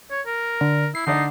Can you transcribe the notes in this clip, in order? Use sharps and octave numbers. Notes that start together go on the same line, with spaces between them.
C#5
A#4
D3
E4 C7
D3 D4 D#4 D5